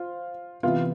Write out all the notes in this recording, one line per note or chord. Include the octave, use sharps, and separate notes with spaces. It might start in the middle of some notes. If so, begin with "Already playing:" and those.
Already playing: F4 C5
C3 E3 B3 F4